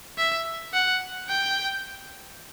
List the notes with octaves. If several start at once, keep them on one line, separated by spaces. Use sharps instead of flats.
E5
F#5
G5